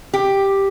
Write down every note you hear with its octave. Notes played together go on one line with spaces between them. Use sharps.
G4